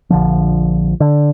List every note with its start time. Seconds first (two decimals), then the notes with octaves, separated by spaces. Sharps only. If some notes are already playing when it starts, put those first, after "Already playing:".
0.10 A#1 D3 F3
1.00 D3